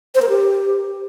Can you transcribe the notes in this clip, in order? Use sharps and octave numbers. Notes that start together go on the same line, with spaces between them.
C5
A#4
G4